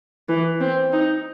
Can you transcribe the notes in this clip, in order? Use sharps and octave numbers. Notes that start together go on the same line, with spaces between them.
E3
C4
D#4